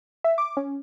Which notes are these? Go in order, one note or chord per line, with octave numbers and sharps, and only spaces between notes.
E5
D6
C#4